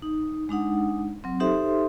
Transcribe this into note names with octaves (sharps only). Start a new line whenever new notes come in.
D#4
G#3 D4 D#4 F#5
F#3 C4
D#4 G4 A4 C5 E5 C6